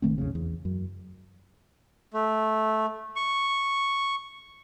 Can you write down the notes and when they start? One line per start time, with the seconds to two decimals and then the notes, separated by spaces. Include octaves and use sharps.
0.02 A1 D#3 A3 C4
0.18 B1 F2 C#3
0.35 E2
0.65 F#2
2.14 A3
3.16 C#6